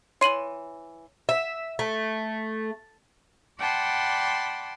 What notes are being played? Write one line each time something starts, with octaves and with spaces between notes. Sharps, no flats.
E3 C#5 C6 D#7 F#7
E5
A3
D5 F#5 G5 A5 B5 C6